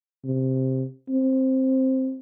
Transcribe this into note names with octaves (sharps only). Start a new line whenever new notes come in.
C3
C4